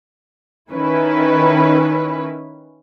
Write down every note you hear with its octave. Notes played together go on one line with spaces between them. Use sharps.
D#3 C#4 E4 B4